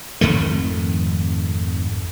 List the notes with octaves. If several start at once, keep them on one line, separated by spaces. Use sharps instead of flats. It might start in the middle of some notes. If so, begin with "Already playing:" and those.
G#1 F2 D#3 A3